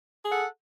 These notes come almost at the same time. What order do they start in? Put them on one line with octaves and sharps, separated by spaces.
G#4 F#5 A4